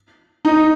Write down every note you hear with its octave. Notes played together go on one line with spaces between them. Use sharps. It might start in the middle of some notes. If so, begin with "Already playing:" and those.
D#4